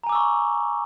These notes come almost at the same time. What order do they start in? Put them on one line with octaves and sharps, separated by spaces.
A#5 G#5 D6 E6 C#6